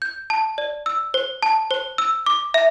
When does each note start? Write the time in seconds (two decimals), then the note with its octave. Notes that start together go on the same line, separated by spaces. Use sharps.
0.02 G6
0.30 A5
0.58 D5
0.86 E6
1.14 C5
1.43 A5
1.71 C5
1.98 E6
2.26 D6
2.54 E5